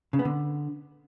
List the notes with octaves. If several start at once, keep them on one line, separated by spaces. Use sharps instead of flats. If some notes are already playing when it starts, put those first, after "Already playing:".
C#3
B3
D3